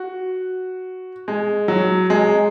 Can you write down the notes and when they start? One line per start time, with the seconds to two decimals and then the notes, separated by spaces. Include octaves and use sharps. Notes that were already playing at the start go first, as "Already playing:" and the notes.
Already playing: F#4
1.28 G#3
1.68 F#3
2.10 G#3